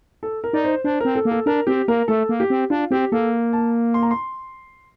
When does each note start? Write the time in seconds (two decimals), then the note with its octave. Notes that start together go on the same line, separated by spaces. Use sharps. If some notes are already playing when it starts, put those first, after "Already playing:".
0.23 A4
0.44 A#4
0.53 D#4 D5
0.64 C5
0.84 D4 C5
1.00 C4 A#4
1.15 A4
1.25 A#3
1.31 A4
1.46 D4 A#4
1.67 C4 G4
1.88 A#3 A#4
2.08 A3 A4
2.29 A#3
2.40 G4
2.50 C4
2.70 D4 F4
2.91 C4 G4
3.12 A#3 A4
3.53 A5
3.94 C6
4.03 A#5
4.11 C6